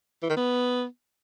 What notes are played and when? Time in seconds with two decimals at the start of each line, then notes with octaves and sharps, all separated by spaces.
0.23 E3
0.30 D#3
0.37 B3